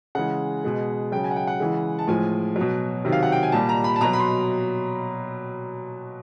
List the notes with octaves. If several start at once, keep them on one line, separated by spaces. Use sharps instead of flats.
C#3 E3 G#3 F#5
B2 G#3
C#3 F#3 G5
G#5
F#5
G5
F#5
C#3 E3 G#3
A5
A2 F3 G#3 G#5
F#3
B2
C3 D#3 F#3
F5
F#5
G5
G#5
A#2 G3 A5
A#5
B5
A5
B2 F#3 A#5
B5
C6